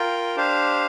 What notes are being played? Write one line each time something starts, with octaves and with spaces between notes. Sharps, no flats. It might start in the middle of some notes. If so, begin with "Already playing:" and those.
Already playing: F4 A#4 G5
D4 G4 C5 F5